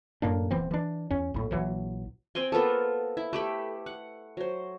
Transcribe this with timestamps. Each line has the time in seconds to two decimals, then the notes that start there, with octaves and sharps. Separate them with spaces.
0.22 F#2 A2 A#3 D4
0.50 D#1 E3 B3 C4
0.71 E3 D4
1.11 E2 C#4
1.34 A#1 A2
1.51 A#1 E3 F#3
2.35 C4 G5 G#5 C6
2.52 A#3 B3 F4 A4
3.17 E4
3.33 A3 G4 B5
3.86 F#5
4.37 F#3 C5